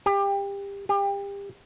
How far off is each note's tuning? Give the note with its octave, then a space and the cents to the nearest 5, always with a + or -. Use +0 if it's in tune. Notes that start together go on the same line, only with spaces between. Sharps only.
G4 +25
G4 +30